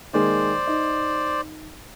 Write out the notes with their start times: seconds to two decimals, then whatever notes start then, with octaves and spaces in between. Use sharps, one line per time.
0.13 D#3 G#3 A#3 C5 D5
0.67 D#4